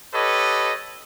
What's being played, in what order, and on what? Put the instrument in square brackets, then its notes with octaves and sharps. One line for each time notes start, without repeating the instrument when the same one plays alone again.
[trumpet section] G4 A4 B4 C#5 D#5